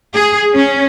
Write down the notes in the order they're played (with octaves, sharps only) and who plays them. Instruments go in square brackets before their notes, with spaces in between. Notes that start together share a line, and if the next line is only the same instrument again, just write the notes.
[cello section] G#4
C#4